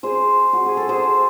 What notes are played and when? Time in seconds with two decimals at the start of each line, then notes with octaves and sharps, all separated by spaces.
0.03 G#4 C5
0.53 F#4
0.66 G#4
0.77 A4
0.89 G#4 C5